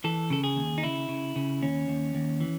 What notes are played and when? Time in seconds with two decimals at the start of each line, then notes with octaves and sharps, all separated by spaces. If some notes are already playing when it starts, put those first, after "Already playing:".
0.04 E3 A4
0.30 C#3 A4
0.44 G#4
0.56 D#2
0.78 D#4
0.83 C#3 E4
1.09 C#3
1.36 C#3
1.62 D#2 C#4
1.88 D#2
2.15 D#2
2.41 E3